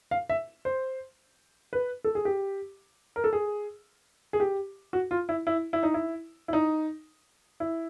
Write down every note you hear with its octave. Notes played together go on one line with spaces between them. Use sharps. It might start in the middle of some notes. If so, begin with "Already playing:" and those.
F5
E5
C5
B4
A4
G#4
G4
A#4
A4
G#4
G#4
G4
F#4
F4
E4
E4
E4
D#4
E4
E4
D#4
E4